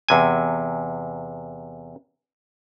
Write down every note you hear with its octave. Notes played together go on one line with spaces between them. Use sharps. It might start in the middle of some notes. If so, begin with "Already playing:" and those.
E2 C3 G#5